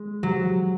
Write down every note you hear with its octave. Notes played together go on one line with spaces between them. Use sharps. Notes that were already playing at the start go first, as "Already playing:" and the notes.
Already playing: G#3
F#3